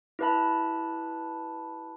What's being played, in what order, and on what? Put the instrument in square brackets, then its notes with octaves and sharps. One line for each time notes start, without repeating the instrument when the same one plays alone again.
[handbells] E4 G4 B4 E5 A5 B5